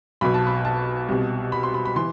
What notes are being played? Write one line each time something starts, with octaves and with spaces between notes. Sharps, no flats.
B1 B2 B5
A5
B5
A5
C2 B2
B5
C6
B5
B5
E3 C6